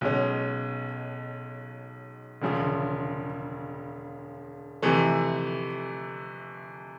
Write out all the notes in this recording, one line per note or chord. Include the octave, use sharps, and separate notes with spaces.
B1 B2 G#3 C#4
E1 D2 C#3 F3
F2 C3 E3 A3